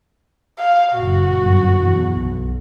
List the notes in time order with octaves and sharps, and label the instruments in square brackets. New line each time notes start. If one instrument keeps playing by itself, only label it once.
[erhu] F5
[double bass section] F#1 A#2 [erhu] F#4
[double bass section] G1 F#2
E2 B2
B1